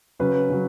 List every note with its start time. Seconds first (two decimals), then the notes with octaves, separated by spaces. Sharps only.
0.19 C#3 F#3 B4
0.49 C#3 F#3